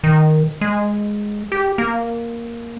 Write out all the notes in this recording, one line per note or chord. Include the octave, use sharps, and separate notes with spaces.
D#3
G#3
G4
A#3